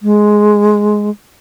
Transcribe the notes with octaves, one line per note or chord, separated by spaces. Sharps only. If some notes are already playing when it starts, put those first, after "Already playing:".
G#3